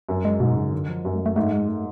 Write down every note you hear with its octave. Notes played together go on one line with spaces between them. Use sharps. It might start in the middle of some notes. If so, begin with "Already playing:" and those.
F#2
G#3
G#2 B2
C#3
D3
F3
F#2 F#3
A3
A3
G#2 A3
G#3
A3